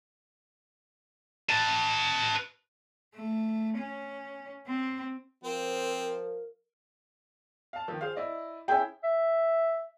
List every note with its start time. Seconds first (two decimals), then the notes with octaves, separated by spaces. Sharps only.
1.49 B4 A5
3.15 A3
3.78 C#4
4.67 C4
5.44 F3 C4 A#4
7.73 F5 A5
7.88 D#3 F3
8.01 G#4 C5 F5
8.16 E4 D5 D#5
8.68 C#4 E4 G#4 G5 G#5
9.04 E5